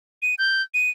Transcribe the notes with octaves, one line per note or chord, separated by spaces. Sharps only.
D#7
G6
D#7